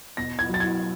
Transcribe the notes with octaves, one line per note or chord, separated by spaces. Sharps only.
B2 A#6
G#6
F#3 A6
G#6